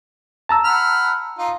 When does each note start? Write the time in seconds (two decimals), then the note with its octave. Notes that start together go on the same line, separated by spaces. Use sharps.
0.49 A5 A#5 E6
0.65 F#5 B5 F6
1.39 D#4 F4